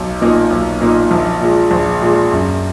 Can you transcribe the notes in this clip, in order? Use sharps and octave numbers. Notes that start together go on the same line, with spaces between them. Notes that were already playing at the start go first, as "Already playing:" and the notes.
Already playing: B1
A#2 A#3 D#4
B1
A#2 A#3 D#4
A#1
A#2 G#3
A#1
A#2 G#3
F#2